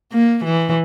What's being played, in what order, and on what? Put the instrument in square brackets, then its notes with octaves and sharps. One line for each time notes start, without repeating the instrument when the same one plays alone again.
[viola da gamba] A#3
E3